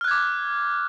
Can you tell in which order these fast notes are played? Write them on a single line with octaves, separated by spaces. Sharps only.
F6 F#6 G#6 D6